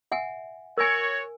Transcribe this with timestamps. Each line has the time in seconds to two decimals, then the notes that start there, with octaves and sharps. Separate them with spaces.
0.12 E5 F#5 G#5
0.78 F#4 A#4 C#5 G#5